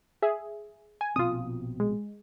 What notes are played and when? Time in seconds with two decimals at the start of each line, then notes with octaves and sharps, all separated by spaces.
0.22 G#4 E5
1.01 G#5
1.16 A#1 B2 C4 F4 D#6
1.80 G#3